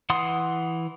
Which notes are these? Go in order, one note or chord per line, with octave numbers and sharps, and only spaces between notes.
E3 F#5 C6 D#6